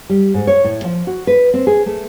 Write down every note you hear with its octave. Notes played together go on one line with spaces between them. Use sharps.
G3
G#2
C#5
A2
F3
F#4
B4
C4
G#4
A3